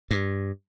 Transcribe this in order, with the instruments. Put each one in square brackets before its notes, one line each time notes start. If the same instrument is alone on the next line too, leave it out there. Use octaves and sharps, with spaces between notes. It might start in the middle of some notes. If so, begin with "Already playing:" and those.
[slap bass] G2